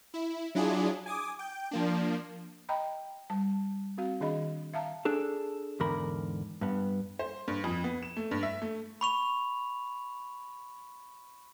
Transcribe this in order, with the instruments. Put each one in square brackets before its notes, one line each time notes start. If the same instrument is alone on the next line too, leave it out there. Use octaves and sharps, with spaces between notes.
[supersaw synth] E4
F#3 D4 E4 F4 G#4
G#5 D6 D#6
G5
F3 A#3 D4
[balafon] D#5 G5 A#5 B5
G3 A5
C4 F#4 F5
D#3 D4 G#4 D#5 B5
E5 F5 A5 A#5
[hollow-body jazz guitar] D4 G#4 A4
E2 G#2 D3 A#4 B5
G2 B3
[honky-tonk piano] C5
G2
F2
B3
E7
A3
G2
E5
A3
[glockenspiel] B5 C#6 F7